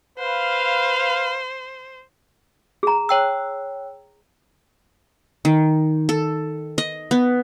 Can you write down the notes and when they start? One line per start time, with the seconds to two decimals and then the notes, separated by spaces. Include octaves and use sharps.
0.19 B4 C5 F5
2.83 G#4 A#5
3.09 C#5 G5 E6
5.45 D#3
6.09 A4
6.78 D#5
7.11 B3